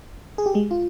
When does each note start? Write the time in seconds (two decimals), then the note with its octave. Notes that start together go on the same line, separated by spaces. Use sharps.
0.38 G#4
0.46 G4
0.54 G#3 G#4
0.71 F4